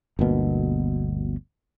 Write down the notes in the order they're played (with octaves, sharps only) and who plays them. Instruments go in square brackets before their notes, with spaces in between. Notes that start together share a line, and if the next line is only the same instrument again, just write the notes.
[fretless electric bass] G1 D2 B2 A#3